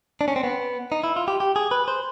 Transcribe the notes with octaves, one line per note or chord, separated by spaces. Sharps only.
D4
C#4
C4
B3
D#4
E4
F4
G4
G4
G#4
B4
C5